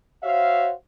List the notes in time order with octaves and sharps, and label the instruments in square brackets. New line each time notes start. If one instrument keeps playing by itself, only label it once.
[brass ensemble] F#4 C5 C#5 E5 F5